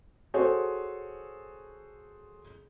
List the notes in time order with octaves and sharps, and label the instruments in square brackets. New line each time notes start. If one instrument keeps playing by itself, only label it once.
[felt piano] F#4 G#4 A4 C5 C#5